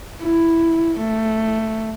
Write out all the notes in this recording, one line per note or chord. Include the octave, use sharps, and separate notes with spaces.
E4
A3